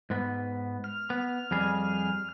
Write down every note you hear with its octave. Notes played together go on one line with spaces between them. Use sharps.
G#2 B3
F6
B3
F2 G3 G#4